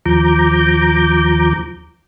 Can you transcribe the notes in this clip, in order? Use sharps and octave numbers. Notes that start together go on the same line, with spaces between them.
D#2 F3 A#5 D6 G6